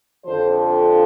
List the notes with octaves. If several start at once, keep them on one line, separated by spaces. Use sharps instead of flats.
F2 D3 F3 C5